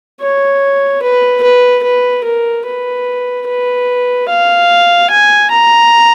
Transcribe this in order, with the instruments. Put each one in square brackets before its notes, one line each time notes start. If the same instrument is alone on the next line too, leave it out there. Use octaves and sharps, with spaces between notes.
[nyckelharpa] C#5
B4
B4
B4
A#4
B4
B4
F5
G#5
A#5